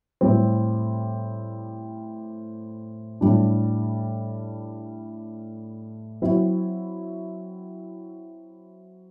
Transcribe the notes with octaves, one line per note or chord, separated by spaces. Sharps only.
A2 G3 C4
A2 G3 D4
F#3 C4 E4